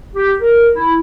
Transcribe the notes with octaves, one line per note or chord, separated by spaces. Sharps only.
G4
A#4
E4